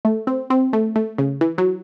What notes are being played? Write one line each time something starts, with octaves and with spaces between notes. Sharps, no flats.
A3
C4
C4
A3
A3
C#3
E3
F#3